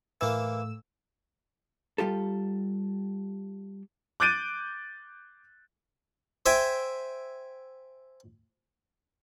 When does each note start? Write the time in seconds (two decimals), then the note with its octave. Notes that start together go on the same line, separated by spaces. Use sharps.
0.21 A2 E3 A#3 E6
1.98 G3 F4 G4 A4
4.20 D6 F#6 G6 A6 D7 D#7
6.46 C5 E5 G5 G#5